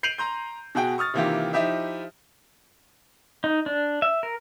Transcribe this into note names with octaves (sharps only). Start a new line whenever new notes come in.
G6 C7 D7 D#7 F7 F#7
A#5 C6 G6
B2 F#4 G#4 G5
C#6 D#6 F6 A6
C3 D#3 E3 A#3 F4 G4
F3 D#4 E4 G4 E5
D#4
D4
E5
A#4